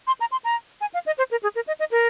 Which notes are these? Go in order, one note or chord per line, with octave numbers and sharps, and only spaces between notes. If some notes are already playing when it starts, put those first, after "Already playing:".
C6
A#5
C6
A#5
G#5
F5
D#5
C5
A#4
G#4
A#4
D#5
D#5
A#4